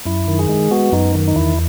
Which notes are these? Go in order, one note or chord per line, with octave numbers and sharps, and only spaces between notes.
F#2 E4
D#3
G#4
G#3
B3 F#4
F#2 D#4
D#3
D#4
E2 E4